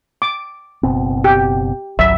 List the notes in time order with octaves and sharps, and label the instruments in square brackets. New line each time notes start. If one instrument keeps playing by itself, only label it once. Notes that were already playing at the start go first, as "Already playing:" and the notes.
[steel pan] D6
[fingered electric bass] F#1 B2 C4
[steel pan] G4
[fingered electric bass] G#1 C#2 F#3 [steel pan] E5